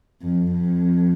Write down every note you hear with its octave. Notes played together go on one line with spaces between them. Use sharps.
F2
F2